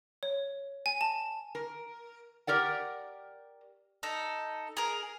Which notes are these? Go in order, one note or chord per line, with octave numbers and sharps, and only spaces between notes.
C#5
G#5
A5
A#4
G4 A#4 D5 F#5
D#4 A4
G#4 A#4